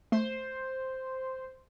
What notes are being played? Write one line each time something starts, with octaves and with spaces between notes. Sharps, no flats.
A3 C5